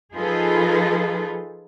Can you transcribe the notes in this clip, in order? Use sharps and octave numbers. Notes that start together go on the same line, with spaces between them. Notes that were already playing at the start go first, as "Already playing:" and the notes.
F3 D#4 F4 G#4 A4 B4